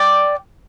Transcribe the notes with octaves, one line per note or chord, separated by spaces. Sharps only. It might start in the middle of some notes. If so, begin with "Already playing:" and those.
Already playing: D5 G5 D6